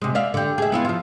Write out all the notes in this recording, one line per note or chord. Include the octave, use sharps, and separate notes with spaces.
C3 G#3
D5 E5 F5
D3 G4
G#4 E5
B3 E4 F4
F3 F4